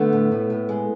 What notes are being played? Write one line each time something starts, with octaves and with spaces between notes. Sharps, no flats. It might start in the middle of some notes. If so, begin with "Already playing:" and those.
Already playing: D3 A3 B3
A2
A2
A2
G#3